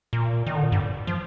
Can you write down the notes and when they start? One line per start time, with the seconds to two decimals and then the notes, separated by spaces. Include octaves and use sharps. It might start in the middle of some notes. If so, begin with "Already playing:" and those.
0.13 A#2
0.46 D#3
0.55 D3
0.63 A#2
0.72 G2
1.07 F3